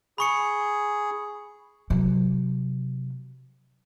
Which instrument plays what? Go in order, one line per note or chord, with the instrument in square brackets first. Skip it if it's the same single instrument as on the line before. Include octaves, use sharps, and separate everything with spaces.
[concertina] G#4 [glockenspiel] B5 C#6 C#7
[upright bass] C3 F#3